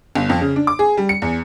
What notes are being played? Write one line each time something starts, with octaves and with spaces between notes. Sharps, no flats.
G1
F2
C#3
D4
D6
G#4
G3
C#7
E2